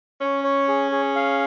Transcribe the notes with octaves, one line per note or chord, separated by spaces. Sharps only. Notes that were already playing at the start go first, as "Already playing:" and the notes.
C#4 C#5
C#5
G#4
G#4
F5